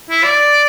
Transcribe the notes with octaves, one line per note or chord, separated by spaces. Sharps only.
E4
D5